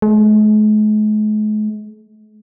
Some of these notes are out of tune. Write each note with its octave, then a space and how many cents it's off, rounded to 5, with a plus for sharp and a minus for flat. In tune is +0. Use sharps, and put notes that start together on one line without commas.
G#3 +45